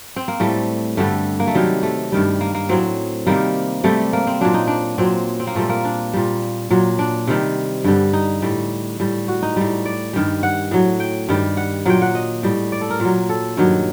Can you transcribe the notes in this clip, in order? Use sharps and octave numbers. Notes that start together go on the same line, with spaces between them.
C4
A#3
A2 G3 A3
G2 D3 G3 A3
A#3
A3
C3 D#3 F#3 G3
A3
G2 D#3 G3
A#3
A#3
A2 F#3 C4
C3 D#3 G3 A#3
C3 G3 A3
A#3
C4
A#2 F#3 D4
D#4
D4
A#2 F#3 C4
C4
A#3
A#2 G3 A3
A#3
D4
A#2 G3
A#2 F#3
D4
C3 D#3 G3
G2 D3 G3
D#4
A2 G3
A2 G3
F#4
D#4
A2 G3
D5
G2 D#3 G3
F#5
A2 F#3
G5
G2 D#3 G3
F#5
A#2 F#3 G5
F#5
D#5
A2 G3
D5
A4
A#4
A#2 F#3
A4
G2 D#3 F#3